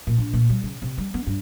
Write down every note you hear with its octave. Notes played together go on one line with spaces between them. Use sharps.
A#2
A#1
A#2
G3
C#3
C3
G3
B3
G2